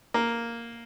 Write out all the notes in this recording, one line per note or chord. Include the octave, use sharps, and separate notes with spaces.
A#3